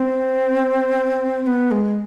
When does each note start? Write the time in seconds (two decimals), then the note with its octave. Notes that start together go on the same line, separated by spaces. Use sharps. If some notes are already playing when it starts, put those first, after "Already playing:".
Already playing: C4
1.42 C4
1.47 B3
1.71 G#3